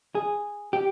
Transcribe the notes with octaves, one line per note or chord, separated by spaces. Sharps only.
G#4
G4